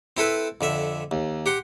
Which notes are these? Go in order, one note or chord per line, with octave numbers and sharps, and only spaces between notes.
C4 E4 A4 B4
F2 D3 E5
D#2
G4 F#5 C6